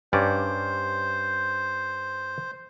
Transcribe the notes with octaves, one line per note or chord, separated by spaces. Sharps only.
G2 C#4 C5 D5